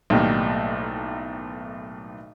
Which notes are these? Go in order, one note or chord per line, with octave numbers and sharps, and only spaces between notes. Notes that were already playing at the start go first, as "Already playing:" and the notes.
B1 A2 D#3 G3 A#3